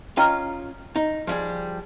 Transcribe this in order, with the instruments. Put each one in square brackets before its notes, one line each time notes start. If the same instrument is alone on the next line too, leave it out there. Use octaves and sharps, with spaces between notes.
[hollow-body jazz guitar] C#4 F4 D#5 [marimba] G5 A#5 F6
[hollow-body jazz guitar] D#4
F3 G3 G#4